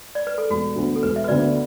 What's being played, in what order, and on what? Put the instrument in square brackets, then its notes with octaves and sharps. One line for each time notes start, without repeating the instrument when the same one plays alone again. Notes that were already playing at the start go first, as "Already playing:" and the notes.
[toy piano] D5
B4
A4
[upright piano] E1 [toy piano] F#4
[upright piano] D2 D3 B3
[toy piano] A4
[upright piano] E1 [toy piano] B4
[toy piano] E5
B4
[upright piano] D2 D3 B3 [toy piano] D5